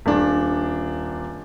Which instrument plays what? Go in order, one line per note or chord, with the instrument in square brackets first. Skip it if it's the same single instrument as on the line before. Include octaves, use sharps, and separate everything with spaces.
[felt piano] D#1 D4